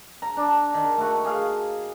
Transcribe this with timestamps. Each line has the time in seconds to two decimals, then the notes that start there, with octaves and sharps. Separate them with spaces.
0.22 A#5
0.37 D4
0.74 D#3
0.98 A3 F#4
1.25 G#4 F5